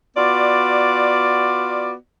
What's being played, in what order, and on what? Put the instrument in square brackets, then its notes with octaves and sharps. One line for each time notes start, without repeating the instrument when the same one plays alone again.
[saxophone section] B3 F4 F#4 D5